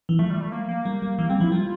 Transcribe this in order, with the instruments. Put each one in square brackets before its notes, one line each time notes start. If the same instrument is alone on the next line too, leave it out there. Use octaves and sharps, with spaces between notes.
[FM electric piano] E3
[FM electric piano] F3 [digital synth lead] A3
[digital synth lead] G3
A3
A#3
A#3
[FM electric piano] G3
G3
[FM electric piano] E3 [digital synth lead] A#3
[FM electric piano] G3 [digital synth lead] C4
[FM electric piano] F3 [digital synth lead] E4
[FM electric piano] G3 [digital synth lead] F4